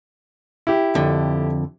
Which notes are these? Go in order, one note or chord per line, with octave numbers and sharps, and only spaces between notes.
E4 G4
F2 D3